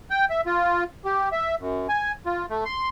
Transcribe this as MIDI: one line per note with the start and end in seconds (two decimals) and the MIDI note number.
0.11 0.25 79
0.30 0.41 76
0.46 0.84 65
1.05 1.29 67
1.32 1.55 76
1.59 1.87 42
1.89 2.12 80
2.26 2.46 65
2.50 2.64 57
2.65 2.89 84